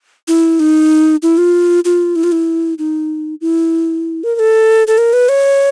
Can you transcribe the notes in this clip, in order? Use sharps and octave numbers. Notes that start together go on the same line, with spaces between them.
E4
D#4
E4
F4
F4
E4
F4
E4
D#4
E4
A#4
A#4
A4
A4
A#4
B4
C#5